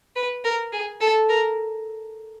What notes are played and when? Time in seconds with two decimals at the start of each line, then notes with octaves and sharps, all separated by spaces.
0.16 B4
0.44 A#4
0.72 G#4
1.01 A4
1.29 A#4